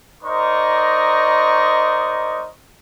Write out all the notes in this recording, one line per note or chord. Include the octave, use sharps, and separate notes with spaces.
D#4 A#4 C5 D5 D#5 C#6